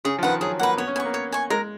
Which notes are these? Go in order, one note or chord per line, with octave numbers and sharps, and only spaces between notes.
C#3 G#4
F3
D#3 B4 F#5
F#3 G#4
A#3 B4 F#5
B3 C#5
C#4
B3 G#5
C#6
A#3
C#5
G#5 C#6
G#3 A#4